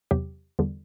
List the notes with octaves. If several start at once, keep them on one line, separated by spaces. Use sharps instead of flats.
E2 C3 F#3 G4
E2 D3 G3